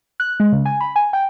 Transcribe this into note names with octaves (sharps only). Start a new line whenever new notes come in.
F#6
G#3
C#3
G#5
B5
G#5
G5